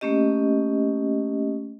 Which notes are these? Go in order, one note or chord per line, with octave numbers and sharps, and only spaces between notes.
A3 A#3 C#4 G4 D#5